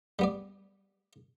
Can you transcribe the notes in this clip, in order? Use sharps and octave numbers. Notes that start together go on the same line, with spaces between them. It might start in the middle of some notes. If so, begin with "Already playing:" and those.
G3 B3 D5